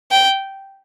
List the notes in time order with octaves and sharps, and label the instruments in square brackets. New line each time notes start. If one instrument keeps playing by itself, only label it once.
[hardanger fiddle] G5